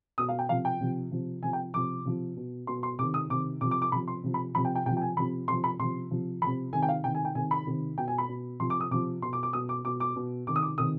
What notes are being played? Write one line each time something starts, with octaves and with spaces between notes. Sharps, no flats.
B2 D#6
F5
G5
C3 F3 F5
G5
C3 F3
C3 F3
C3 F3 G#5
G5
C3 F3 D6
C3 F3
B2
B2 C6
C6
C3 D#3 D6
D#6
C3 D#3 D6
C3 F3 D6
D6
D6
C3 F3 B5
C6
C3 F3
B5
C3 F3 B5
G5
G5
C3 F3 G5
G5
G#5
C3 F3 B5
C3 F3 C6
B5
C3 F3 C6
C3 F3
C3 F3 B5
C3 D#3 G#5
G5
F5
C3 D#3 G5
G#5
G5
C3 D#3 G#5
B5
C3 D#3
B2 G5
G#5
B5
B2
C3 F3 C6
D6
D#6
C3 F3 D6
B2 C6
D6
D6
B2 D#6
D6
B2 D6
D6
B2
C3 D#3 D6
D#6
D6
C3 D#3 D#6